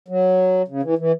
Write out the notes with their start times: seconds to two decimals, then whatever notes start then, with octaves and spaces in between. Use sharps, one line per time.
0.08 F#3
0.68 C#3
0.83 E3
0.98 E3